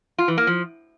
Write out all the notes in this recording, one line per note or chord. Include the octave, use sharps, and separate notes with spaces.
F4
E3
A#3
F3